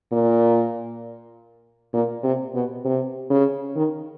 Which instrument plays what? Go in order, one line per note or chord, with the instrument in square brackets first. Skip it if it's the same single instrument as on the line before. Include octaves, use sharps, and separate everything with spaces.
[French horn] A#2
A#2
C3
B2
C3
C#3
D#3